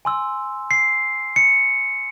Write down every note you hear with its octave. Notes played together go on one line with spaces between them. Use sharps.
G#5 C6 E6
C7
C#7